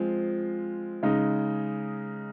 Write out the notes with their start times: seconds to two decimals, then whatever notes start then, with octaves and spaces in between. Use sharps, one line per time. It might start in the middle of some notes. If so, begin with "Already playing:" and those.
Already playing: F3 G#3 C4 F4
1.03 C#3 G#3 D#4